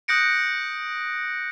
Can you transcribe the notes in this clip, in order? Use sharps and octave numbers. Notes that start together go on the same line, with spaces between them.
D#6 F#6 G6 A#6 C#7 D7